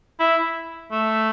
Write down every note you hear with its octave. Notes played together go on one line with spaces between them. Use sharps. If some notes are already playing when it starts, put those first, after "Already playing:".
E4
A3